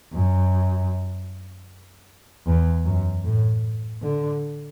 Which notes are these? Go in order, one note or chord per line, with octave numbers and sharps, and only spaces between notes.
F#2
E2
F#2
A2
D3